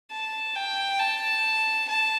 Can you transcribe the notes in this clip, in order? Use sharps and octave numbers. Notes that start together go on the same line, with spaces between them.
A5
G5
A5
A5